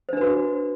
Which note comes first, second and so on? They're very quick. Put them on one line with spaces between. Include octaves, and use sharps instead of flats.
C5 D4 B4 F#4